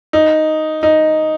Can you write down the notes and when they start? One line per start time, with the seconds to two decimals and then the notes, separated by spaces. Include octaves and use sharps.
0.13 D#4
0.83 D#4